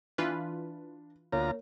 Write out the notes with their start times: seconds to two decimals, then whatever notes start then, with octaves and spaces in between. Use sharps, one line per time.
0.18 E3 D4 F4 B4
1.33 D2 A#3 F4 C#5 A#5